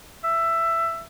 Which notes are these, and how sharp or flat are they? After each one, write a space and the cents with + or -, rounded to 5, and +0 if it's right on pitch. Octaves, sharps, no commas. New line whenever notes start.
E5 +15